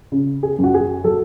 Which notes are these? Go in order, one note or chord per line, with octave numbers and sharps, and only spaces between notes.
C#3
G#4
F#2
F#4
G#4
F#3 A4